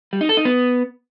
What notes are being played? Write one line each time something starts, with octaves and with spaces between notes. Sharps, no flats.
G3
D#4
A4
D#4
B3